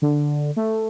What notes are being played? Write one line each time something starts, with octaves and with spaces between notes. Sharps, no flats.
D3
A3